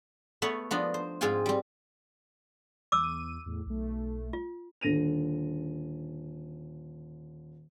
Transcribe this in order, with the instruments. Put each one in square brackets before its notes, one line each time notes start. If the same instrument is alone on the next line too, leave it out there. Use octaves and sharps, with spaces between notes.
[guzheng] A3 B3 B4 C#5 F#5
F3 B3 D4 D#4
C5
G#2 C4 F4 G#4 G5 G#5
G3 C4
[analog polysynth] E2 D#7 [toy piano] D6 E6
[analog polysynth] E2 A2
B1 A3
[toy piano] F4
[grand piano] D#1 D3 A#6 D#7 F7